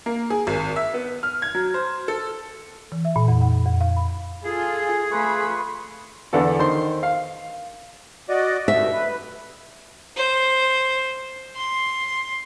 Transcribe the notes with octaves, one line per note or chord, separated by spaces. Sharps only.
A#3
G#4
G#1
E5
B3
F6
G#6
F#3
C5
A4
E3
E5
A#2
F2
F#5
F2
F5
B5
F4 G#4 A4
A3 F4 B4 B5 C#6
E2 D3 B3 A4
D#3 C5 C6
F5
F#4 D5 D#5
G2 B2 A3 E5
B4
C5
C6